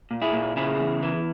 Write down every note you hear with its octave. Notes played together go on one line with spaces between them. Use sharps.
A#2
E4 G#4
A#2
C#3 E4 G#4
E2
E3